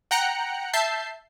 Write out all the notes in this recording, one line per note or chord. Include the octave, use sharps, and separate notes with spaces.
F#5 G5 A#5 F#6 C#7
E5 A5 G6 C7